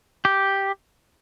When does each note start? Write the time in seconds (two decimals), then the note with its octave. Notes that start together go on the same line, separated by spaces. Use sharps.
0.25 G4